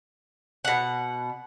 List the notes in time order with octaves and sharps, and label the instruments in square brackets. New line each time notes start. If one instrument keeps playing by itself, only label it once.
[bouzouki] B2 F#5